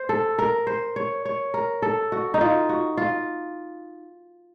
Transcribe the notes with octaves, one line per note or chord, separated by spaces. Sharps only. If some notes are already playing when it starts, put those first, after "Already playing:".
Already playing: C5
A4
A#4
C5
C#5
C#5
A#4
A4
F#4
D#4
F4
F#4
F4